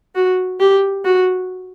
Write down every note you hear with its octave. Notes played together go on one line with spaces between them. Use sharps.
F#4
G4
F#4